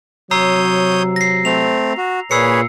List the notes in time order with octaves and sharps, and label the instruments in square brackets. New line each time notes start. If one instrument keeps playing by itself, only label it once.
[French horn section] C3 F#3 [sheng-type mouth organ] C#5 D#6 G6 [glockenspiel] A#5 E6 C7
[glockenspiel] A#6 C7
[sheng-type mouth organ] A3 C4 [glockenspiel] F7
[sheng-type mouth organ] F#4
[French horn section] A#2 [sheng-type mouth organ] G#4 B4 C#5 [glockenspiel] E6 C7 C#7